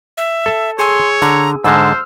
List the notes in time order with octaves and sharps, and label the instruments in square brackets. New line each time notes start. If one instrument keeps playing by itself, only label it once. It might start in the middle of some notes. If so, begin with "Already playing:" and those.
[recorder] E5
[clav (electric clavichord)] A4 A5
[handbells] G#4 G#5 E6 [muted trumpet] C#5 [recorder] C6
[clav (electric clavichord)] D3 [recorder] A#5
[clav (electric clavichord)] G#2 D3 G#3 [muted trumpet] C5 [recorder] A5 [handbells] E6 F6